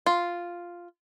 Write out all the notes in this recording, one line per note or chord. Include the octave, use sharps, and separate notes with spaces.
F4